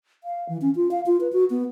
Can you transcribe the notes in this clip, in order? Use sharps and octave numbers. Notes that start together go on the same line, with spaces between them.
F5
E3
C#4
F4
F5
F4
B4
F#4
B3